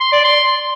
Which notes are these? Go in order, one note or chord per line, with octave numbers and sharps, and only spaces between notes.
C6
D5
C6